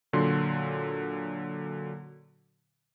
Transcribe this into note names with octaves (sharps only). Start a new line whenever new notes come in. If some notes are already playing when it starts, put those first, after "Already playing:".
A#2 D3 F#3 C6